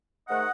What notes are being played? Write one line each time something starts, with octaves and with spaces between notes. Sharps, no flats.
G#2 D#3 A3 D#5 F#5